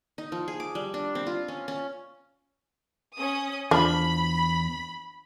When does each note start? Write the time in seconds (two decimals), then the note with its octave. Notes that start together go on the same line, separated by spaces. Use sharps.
0.18 D#4
0.32 F3
0.48 G#4
0.60 D6
0.75 G3
0.94 D4
1.15 C4
1.26 F4
1.48 C#4
1.68 C#4
3.16 C#4 D#6
3.71 E2 F3 D4 B5